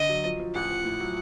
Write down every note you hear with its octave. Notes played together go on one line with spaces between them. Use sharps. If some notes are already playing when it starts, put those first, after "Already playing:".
Already playing: D3 D#5
F#3
F3
F3
A1 F#5
F3
A2
F#3